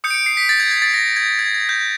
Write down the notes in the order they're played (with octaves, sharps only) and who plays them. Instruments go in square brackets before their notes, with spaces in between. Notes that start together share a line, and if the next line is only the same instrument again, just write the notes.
[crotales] D#6 G6 C#7
D7
C#7
C7
B6
A6
G#6
G#6
A6
A#6
G#6
G#6
G#6
G6